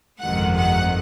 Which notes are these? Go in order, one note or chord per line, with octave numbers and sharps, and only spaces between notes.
G1 F2 C3 D#3 G#3 F#5
F#5